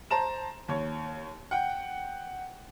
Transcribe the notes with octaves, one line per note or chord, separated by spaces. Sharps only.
C5 A5 A#5 E7
D#2 C#5
F#5 G5